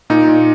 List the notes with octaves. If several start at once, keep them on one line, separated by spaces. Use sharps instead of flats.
A#2 D#4
A#2